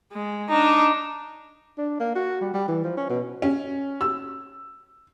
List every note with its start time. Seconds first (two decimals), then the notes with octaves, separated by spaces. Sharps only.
0.12 G#3
0.49 D4 D#4
1.78 D4
2.00 A#3
2.15 F#4
2.41 G3
2.54 G3
2.68 E3
2.83 F3
2.97 C#4
3.09 B2
3.42 C#4
4.01 E6